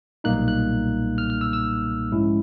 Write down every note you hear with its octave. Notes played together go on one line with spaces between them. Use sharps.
B1 A#2 G3 A#3 D#4 F#6
F#6
F6
F6
E6
E6
G#2 F3 G#3 C#4 E4